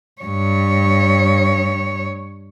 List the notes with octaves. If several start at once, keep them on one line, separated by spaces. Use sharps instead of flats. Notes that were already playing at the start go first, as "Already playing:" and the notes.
G2 C#5